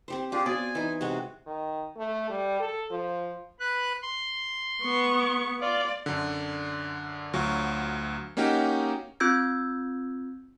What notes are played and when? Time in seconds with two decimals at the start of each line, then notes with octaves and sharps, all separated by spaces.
0.08 C4 G4 C5
0.32 D4 F4 G4 G#4
0.46 B3 F#4 D5 G#5
0.75 E3 D#4
1.01 C3 G#3 F#4
1.46 D#3
1.97 A3
2.30 G3
2.60 A4
2.91 F3
3.60 B4 F#6
4.02 C6
4.83 B3 C#6
5.60 F4 D5
6.06 F#2 D3
7.33 D2 F#3 F4 C#6
8.37 A#3 C#4 D#4 F#4 G4
9.20 C4 F4 E6 G6 G#6